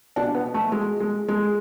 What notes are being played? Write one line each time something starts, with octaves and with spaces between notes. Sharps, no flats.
B2 D4
B3
A3
G#3
G#3
G#3